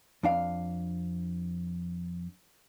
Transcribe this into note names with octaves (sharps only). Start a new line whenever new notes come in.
F2 D4 F5